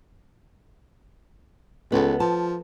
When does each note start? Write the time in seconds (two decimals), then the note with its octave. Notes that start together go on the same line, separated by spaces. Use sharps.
1.92 C#2 B3 A4
2.20 F3 A5